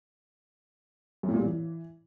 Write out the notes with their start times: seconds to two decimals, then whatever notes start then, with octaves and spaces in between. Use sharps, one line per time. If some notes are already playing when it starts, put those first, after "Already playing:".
1.23 F#2
1.28 A2
1.34 A#2
1.39 G3
1.44 E3